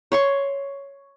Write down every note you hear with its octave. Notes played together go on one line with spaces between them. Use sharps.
C#5 C6 C#6